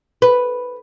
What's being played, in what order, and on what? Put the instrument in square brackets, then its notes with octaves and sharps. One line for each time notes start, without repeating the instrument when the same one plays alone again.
[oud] B4